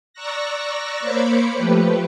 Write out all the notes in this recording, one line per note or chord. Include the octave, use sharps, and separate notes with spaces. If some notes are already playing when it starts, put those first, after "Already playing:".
D5 A#5 C#6 E6 F#6 A#6
A#3 C5 C#5 B5 D6 C#7
F3 A3 G4 B4